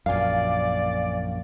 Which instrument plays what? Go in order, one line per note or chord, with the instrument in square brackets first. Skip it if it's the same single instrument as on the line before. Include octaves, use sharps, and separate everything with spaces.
[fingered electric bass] A#1 F#2 [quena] D5 [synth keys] F5 G#5